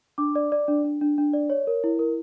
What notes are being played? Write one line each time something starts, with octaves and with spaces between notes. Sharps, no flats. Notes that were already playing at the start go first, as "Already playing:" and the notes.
D4 D6
D5
D5
D4
D4
D4
D4
D5
C#5
A#4
E4
A#4